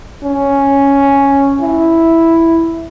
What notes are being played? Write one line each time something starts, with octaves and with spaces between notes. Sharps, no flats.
C#4
E4